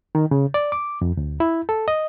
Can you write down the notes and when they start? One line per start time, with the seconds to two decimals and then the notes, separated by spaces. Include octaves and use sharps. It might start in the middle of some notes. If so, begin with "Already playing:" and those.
0.15 D#3
0.31 C#3
0.54 D5
0.72 D6
1.01 F2
1.17 D2
1.40 E4
1.69 A4
1.88 D#5